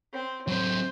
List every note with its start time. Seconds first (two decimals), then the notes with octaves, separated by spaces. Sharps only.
0.13 C4
0.48 F#3 C4 C5